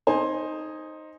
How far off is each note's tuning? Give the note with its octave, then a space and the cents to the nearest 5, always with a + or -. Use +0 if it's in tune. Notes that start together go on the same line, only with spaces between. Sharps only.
D#4 +0 C5 +15 G#5 +0